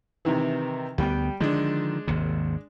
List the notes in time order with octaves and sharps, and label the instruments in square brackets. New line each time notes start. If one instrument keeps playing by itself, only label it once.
[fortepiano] C3 D#3 E3
[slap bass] D2 B3 [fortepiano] G3 G5
[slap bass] D3 D#3 F3 [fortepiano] G#3 D4
[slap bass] G#1 D#2 C3